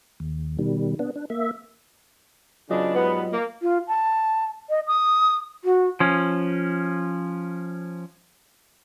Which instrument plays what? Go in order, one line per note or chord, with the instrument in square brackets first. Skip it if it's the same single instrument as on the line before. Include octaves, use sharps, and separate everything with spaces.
[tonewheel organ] D#2
B2 D#3 G3
B3 D4
D4
A#3 E5
[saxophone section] C#3 B3 D4 [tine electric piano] F#3 F4 D#5
[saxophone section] G#2 G3 B3
A#3
[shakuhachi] F4
A5
D#5
D#6
F#4
[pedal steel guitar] F3 C#4